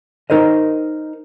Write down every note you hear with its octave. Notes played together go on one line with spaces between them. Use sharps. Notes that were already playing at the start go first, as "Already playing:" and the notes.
D#4 A#4 C5 D#5